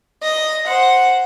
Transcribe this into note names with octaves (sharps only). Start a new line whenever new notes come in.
D#5
C5 F#5